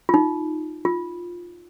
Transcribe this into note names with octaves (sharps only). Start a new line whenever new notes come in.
F4
D#4
F4